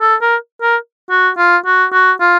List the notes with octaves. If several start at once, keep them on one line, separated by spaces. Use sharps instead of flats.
A4
A#4
A#4
F#4
F4
F#4
F#4
F4